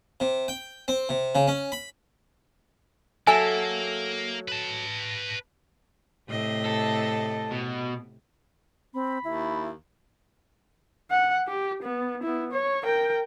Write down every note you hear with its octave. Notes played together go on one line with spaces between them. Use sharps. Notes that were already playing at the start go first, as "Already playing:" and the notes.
C3
G5
C4
C3
C#3
C#4
B5
F#3 A#3 A4 E5 G#5
B4 A5
A2 C3 D#5
A4
B2
C4 B5
D#2 E4
F#5
G4
B3
B3 E4
C#5
A#4 G5